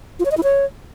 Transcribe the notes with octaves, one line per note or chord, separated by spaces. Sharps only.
F4
C#5
D#5
E4
C#5